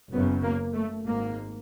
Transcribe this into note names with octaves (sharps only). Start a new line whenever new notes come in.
F#1 F#2 C#3 B3
A#3
A3
G#1 G#2 A#3